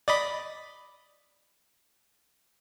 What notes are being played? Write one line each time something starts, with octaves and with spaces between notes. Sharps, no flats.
D5 D#5 B5